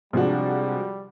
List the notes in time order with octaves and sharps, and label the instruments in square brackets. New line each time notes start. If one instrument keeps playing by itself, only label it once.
[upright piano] C3 D4 [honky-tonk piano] F3 G#3 F#4 [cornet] G3